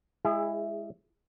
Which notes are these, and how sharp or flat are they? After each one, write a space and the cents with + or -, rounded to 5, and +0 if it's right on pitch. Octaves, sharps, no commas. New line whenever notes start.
G#3 +0 E4 +15 G#4 -25